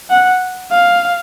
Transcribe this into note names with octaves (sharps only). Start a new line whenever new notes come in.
F#5
F5